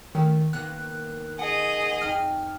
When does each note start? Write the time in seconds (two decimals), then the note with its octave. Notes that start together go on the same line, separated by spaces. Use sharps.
0.15 D#3 A3 C#4 E4
0.53 D#3 A#3 B3 F#6
1.39 G#4 D#5 F#5
2.01 F2 D#4 F6